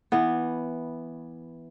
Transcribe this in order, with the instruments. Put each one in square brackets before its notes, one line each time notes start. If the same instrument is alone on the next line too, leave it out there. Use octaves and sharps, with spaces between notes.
[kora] E3 B3